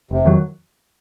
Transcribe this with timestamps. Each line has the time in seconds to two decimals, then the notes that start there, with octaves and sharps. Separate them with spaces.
0.11 F1 C3
0.25 F2 D#3 F#3